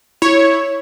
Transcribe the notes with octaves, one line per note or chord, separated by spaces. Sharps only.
E4 C#5